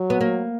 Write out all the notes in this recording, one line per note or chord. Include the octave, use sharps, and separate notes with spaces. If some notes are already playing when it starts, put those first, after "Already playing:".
Already playing: F#3
B3
A#3